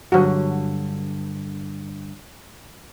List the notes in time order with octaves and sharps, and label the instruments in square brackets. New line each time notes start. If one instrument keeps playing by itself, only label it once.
[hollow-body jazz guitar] G2 D3 [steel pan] F#3 F#4